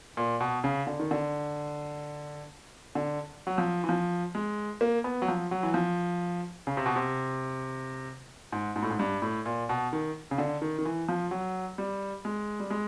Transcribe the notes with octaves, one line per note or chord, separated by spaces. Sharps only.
A#2
B2
C#3
D3
D#3
D3
D3
F#3
F3
E3
F3
G#3
A#3
B3
F#3
F3
F#3
E3
F3
C#3
C3
B2
C3
G#2
G#2
A2
G#2
G2
A2
A#2
B2
D#3
C#3
D3
D#3
D#3
E3
F3
F#3
G3
G#3
G3
G#3